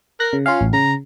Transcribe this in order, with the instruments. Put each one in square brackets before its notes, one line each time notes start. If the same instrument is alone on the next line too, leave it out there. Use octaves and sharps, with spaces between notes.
[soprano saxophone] A#4 [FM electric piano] F#6 A#6
[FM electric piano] C#3
[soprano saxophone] C#4 [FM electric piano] F4 F5
[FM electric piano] A1
[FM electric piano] C#3 [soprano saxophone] A#5